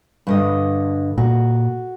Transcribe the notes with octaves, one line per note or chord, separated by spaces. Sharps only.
G2 D3 D#5
A#2 F#4